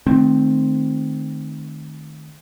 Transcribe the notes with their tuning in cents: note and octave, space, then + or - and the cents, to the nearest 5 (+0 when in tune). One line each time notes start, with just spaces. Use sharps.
D#3 -25 A3 -20 C4 +0